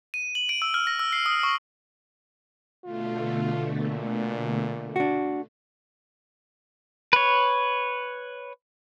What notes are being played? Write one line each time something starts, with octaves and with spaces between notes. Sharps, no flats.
D#7
F#7
D7
E6
F6
A#6
E6
C7
D#6
C#6
B2 D3 A3 F4
A#2
D4 F#4
B4 C#5